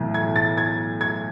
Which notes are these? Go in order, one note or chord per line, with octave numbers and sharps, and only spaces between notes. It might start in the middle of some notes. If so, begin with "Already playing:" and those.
Already playing: B1 A2 E3
G#6
A6
G#6
G#6